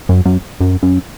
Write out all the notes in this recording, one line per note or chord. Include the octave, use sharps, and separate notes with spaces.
F#2
F#2
F#2
F#2